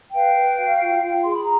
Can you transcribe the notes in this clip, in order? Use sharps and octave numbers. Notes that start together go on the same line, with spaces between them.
B4 F5 G5
B4
F#4
F4
F4
G#4 C6
B5
A#5